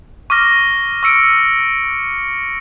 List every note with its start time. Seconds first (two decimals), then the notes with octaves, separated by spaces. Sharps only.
0.30 C#6 D6 F6 A#6
1.03 C#6 E6 C#7 D7